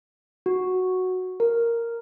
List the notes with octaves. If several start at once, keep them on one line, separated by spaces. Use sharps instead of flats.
F#4
A#4